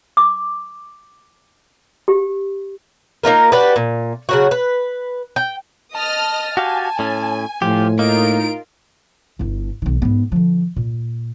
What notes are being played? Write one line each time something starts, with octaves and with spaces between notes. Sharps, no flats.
D6
G4
A#3 D#4 F4 A#4
D4 F#4 G4 B4
A#2
C#3 F#3 F#4
B4
G5
D#5 A5 D#6 F6
F#4 G4 F5 G#5
A2 C#4
A2 F3 G4
A#3 D#4 F4 A#4 D7
G1 E4
B1 D#3
G#2 B3
D3 F3
A#2